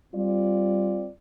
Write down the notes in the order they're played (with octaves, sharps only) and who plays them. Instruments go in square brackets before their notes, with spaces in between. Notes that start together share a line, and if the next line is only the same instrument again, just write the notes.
[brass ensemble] G3 C4 F4 D5